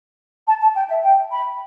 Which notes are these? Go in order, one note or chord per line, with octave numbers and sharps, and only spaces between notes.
A5
A5
G5
E5
G5
B5